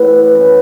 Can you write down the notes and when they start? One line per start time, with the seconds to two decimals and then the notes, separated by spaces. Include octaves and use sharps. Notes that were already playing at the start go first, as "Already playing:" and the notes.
Already playing: A2 E3 B3
0.33 F#2 E3 B3